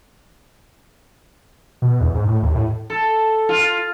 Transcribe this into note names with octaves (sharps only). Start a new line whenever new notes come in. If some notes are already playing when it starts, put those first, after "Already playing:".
B2
E2
G#2
A2
D#2
A2
A4
F4